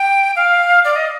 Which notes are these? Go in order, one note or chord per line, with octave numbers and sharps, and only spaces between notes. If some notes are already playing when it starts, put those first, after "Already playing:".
Already playing: G5
F5
D5
D#5